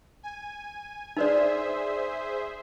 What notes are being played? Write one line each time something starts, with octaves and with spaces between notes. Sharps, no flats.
G#5
D#4 G#4 B4 C5 D5 E5